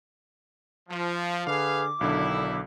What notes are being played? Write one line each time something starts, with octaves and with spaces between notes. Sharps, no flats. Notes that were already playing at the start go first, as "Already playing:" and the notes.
F3
D3 G#4 B4 F5 D6
B1 D3 D#3 D4 E4